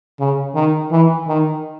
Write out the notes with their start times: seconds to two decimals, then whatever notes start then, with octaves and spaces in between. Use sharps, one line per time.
0.19 C#3
0.54 D#3
0.91 E3
1.27 D#3